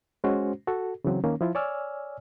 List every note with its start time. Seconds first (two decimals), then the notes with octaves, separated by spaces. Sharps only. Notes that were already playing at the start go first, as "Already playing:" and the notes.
0.24 G#3 C#4 F#4 C5
0.67 F#4 A4
1.04 C#3 E3 F#3 C4
1.24 D#3 A#3 C#4
1.41 F3 E4 F4
1.55 C#5 D5 G#5 E6 F6